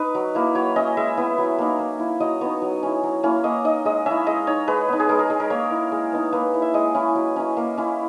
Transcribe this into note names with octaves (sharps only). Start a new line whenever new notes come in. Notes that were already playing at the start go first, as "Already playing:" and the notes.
Already playing: D#4 B4
F#3
A#3 E4
F#3 C#5
C#4 E4 D#5
G#3 E5
B3 E4
F#3
A#3 D#4
A#3
E4
F#3 D#5
B3 D#4 C#5
F#3
C#4 E4
F#3
A#3 C#4 E4
A#3 D#5
D#4 D#5
G#3 D#5
C#4 E4 E5
G#3 D#5
D#4 C#5
G#3 B4
B3 D#4
G#4
G#3 A#4
A#4
D#4 G#4
A#4
A#3 C#5
E4
G#3
B3 D#4
A#3 B4
E4
E5
G#3 D#5
C#4 E4
F#3
C#4 E4
A#3
C#4 E4